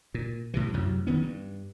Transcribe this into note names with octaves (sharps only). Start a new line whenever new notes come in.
A#2
B1 A2 C3 E3
A1 F#2 C3 F#3
D#3 B3 C#4
G2